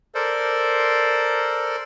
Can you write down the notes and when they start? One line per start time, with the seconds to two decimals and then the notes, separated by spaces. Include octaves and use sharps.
0.15 A4 A#4 C5 D5